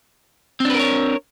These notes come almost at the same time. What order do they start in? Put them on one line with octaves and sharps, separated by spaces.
C4 D4 B4 A#4 C#5